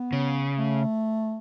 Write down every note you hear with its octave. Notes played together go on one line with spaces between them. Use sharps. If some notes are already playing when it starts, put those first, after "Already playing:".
Already playing: B3
C#3
A3